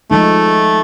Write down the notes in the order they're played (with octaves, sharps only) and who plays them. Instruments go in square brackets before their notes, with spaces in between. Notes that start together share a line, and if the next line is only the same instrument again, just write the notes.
[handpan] F3 G#3 D#4 [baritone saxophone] A3